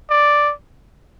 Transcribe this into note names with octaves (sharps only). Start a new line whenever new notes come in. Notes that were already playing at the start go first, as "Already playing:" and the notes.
D5